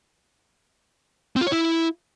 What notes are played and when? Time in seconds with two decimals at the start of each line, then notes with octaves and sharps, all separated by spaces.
1.36 C4
1.41 F4
1.47 C#5
1.52 E4